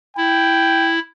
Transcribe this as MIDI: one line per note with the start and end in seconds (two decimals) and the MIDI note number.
0.17 0.99 64
0.17 0.94 79